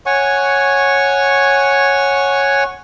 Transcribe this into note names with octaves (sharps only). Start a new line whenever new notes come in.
C#5 F#5 G#5 C#6